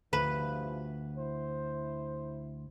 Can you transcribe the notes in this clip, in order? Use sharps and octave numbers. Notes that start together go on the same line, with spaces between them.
D2 G2 E3 F3 B4
E4 C5